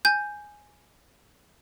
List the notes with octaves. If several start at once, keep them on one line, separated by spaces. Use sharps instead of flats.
G#5 G6